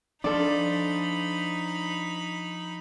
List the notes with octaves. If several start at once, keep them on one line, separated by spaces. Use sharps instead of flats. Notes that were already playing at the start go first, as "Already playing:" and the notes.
F3 D4 D#4 A4 D5 B5